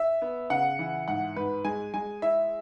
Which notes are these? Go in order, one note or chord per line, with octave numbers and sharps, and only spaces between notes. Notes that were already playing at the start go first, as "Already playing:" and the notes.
Already playing: E5
B3
C#3 F#5
E3
G#2 F#5
G#2 B4
G#3 G#5
G#3 G#5
E4 E5